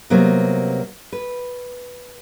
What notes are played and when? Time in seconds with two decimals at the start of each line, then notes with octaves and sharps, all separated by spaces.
0.10 C3 F#3 G3 A#3 B3
1.12 B4